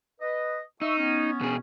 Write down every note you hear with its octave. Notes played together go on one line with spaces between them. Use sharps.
B4 D#5
D#4 E5 C#6 E6
B3 C#4
B2 G#4